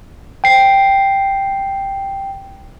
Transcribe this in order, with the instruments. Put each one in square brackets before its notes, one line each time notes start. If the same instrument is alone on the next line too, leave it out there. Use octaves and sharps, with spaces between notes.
[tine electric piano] G5 C7